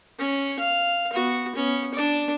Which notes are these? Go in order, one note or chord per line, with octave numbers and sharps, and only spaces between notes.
C#4
F5
B3 F#4
B3 C#4
D4 D5